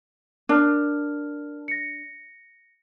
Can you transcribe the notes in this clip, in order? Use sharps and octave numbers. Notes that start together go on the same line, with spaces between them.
D4 A#4 A5 F6
A#6 C#7